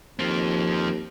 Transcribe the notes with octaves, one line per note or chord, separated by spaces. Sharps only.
D#2 F3 C4